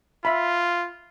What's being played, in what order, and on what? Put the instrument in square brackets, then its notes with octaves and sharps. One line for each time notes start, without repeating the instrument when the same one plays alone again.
[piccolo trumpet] F4 [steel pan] E5 B5